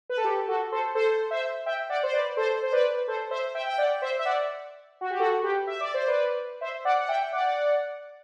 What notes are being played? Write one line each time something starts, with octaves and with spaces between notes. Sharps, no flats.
B4
A4
G4
F#4 A4
A4 C5
A4 C5
C5 E5
E5 G5
D5 F#5
C5
B4 D5
A4 C5
C5
B4 D5
A4 C5
C5 E5
E5 G5
G5
D5 F#5
C5 E5
E5
D5 F#5
F#4
G4
F#4 A4
G4 B4
E5
D5
C5
B4 D5
C5 E5
D5 F#5
F#5
E5 G5
D5 F#5